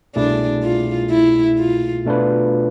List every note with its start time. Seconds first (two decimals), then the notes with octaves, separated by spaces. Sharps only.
0.16 C2 B2 A3 D4 E4 G#4
0.63 F4
1.10 E4
1.58 F4
2.05 B2 A3 D4 F4 B4